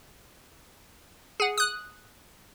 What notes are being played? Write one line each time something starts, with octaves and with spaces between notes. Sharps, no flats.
G#4 F#5
D#6 F#6